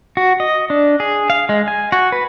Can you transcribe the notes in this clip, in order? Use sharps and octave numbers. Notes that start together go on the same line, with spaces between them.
F#4
D#5
D4
G#4
F5
G#3
G#5
F#4
B4